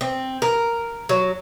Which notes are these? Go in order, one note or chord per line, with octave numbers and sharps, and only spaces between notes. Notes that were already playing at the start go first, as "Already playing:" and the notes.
C4
A#4
F#3